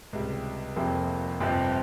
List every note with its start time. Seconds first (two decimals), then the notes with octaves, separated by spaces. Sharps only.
0.13 C#2 C3 G3
0.76 F1 F2 C3 F3 A#3
1.41 G1 F2 C3 F3 C4